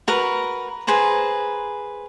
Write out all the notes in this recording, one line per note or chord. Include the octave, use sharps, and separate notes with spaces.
F#4 A#4 B4
G#4 B4 C5 A#5